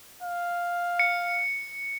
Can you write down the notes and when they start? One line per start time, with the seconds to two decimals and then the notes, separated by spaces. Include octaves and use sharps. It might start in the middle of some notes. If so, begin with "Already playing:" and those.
0.23 F5
0.99 C#7